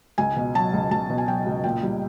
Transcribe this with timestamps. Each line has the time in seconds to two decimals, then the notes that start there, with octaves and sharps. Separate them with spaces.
0.18 C#2 G#5
0.37 B2
0.55 F#3 A5
0.73 C#2
0.91 C#2 A5
1.10 B2
1.18 G#5
1.27 F#3 G5
1.46 C#2
1.64 A#2 G5
1.83 G3